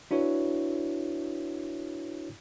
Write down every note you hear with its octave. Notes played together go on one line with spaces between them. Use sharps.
D4 E4 F#4 B4 C#5